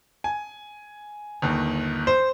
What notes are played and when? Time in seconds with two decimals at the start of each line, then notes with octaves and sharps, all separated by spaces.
0.24 G#5
1.42 G1 D#2
2.07 C5